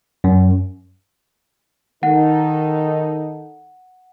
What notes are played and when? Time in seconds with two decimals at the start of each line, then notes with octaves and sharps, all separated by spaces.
0.24 F#2
2.03 D#3 D#4 A4 F#5